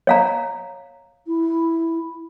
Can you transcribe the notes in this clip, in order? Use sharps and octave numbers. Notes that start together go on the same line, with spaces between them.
C#5 F5 A#5
E4